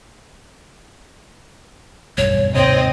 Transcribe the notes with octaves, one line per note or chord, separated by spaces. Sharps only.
E1 B1 G2 C#5
D#2 G#2 C3 C4 C#5 D#5